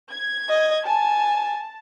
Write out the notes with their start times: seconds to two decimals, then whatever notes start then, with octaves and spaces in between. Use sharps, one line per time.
0.11 G#6
0.49 D#5
0.86 G#5 A5